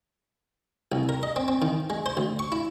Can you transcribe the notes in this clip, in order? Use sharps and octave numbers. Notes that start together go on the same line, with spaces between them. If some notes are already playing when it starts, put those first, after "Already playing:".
C2
A#4
D#5
C4
C4
D#3
G#3
C5
D2
C#6
E4